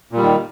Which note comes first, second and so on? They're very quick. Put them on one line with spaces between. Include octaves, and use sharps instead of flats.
A#2 G3 D#3